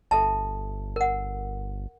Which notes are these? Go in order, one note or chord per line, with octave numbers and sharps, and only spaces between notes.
G1 A4 E5 A5
A#4 F#5